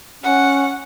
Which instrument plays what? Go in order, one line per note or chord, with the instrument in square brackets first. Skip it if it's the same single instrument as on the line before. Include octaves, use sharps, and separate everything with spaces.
[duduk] C#4 [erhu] F#5